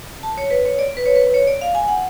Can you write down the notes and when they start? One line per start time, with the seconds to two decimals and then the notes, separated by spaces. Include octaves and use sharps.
0.23 A5
0.38 C#5
0.51 B4
0.65 C#5
0.79 D5
0.97 B4
1.06 C#5
1.16 B4
1.34 C#5
1.47 D5
1.61 F5
1.75 G#5
1.88 F#5